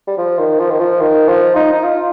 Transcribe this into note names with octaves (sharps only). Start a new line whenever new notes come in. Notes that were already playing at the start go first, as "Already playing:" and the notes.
G3
F3
D#3
F3
D#3
F3
D#3
F3
D#4
D#4
F4